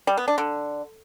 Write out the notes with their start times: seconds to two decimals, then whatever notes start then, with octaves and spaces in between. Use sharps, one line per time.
0.07 G3
0.17 B3
0.28 D4
0.38 D3